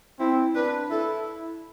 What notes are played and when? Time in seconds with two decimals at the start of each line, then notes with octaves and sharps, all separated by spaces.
0.19 C4 E4
0.55 D4 B4
0.90 E4 A4